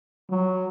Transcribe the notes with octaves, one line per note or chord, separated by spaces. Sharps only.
F#3